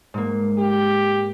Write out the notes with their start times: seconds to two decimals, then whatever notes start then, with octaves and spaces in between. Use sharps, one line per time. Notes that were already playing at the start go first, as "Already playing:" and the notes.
0.14 G#2 A#3
0.58 G4